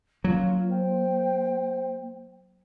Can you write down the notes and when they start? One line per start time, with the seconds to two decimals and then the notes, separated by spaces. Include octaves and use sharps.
0.24 F#3 A#3 C#4 F4
0.70 C5 G5